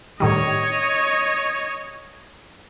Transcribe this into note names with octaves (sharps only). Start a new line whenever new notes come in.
A2 D#3 G3 C#5 D#5